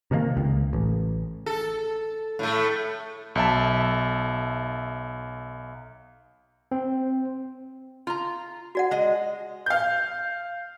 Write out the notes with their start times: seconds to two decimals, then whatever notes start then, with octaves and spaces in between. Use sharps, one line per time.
0.11 C3 D#3 A3 A#3
0.37 C#2
0.73 A1
1.46 A4
2.39 A2 A3
3.35 B1 E5 A5
6.72 C4
8.07 F4 A#5
8.75 F#4 D5 F#5
8.91 G#3 D#5
9.66 F5 G6